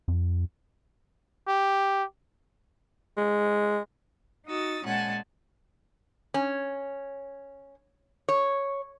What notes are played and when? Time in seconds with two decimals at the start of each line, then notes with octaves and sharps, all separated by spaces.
0.08 F2
1.48 G4
3.17 G#3
4.46 D#4 F#4 D#6 E6 A6
4.84 A#2 G#3 C#4 F#5 G#5 A5
6.34 C#4
8.29 C#5